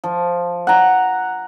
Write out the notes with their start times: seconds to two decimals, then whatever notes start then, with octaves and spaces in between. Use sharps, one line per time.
0.04 F3
0.67 F#5 A#5